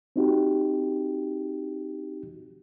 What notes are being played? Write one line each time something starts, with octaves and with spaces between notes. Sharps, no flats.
C4 D#4 F#4 G4